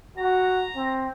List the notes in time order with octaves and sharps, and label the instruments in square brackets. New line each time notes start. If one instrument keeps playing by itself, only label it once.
[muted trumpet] F#4 [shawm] A#5
[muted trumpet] C4